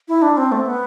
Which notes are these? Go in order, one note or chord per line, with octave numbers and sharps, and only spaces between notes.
E4
D4
C4
A3
B3